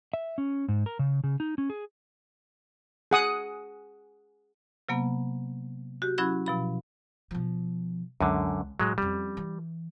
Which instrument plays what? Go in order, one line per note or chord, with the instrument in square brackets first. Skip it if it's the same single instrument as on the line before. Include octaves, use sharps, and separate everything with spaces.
[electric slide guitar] E5
C#4
G#2
A#4
C#3
C#3
D#4
C#4
G#4
[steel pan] G#4 F#5 D#6
[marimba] C3 F#3 A#3 B3
F#4 G4
F#3 C#4 E4 B5 F#6 G#6
B2 F3 B5
[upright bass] B2 F3
[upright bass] C#2 [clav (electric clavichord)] F#2 D3
[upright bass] A2 [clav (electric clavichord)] F#3 G#3
[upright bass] F2 C#4 [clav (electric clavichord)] G3
[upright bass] E3